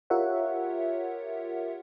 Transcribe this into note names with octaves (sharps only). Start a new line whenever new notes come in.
F4 G4 A#4 C#5 E5 F#5